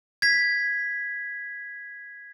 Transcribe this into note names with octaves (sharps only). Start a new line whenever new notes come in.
G#6 B6